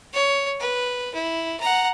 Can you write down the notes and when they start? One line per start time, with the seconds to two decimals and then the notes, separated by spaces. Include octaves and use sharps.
0.14 C#5
0.60 B4
1.15 E4
1.60 F#5 A#5